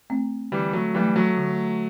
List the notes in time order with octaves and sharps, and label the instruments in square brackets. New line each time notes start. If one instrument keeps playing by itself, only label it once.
[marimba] A3 C4
[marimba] D3 [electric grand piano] E3 G3
[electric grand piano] F#3 A3
[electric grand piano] E3 G3 [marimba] F#3 A3
[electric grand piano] F#3 A3
[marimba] D3